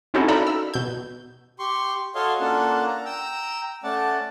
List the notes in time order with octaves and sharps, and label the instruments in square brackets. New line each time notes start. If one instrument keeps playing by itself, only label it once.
[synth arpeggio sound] C4 C#4 D#4 E4 F#4 A4
A4 A#4 D5 E5 A#5 B5
E6
B2 G6
[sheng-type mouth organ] G4 C6 C#6
F#4 A4 C#5 D#5 F5 C6
A#3 C#4 D4 F4 A4 F#5
A#5
G5 A#5 E6
A3 C#4 D5 F#5 A5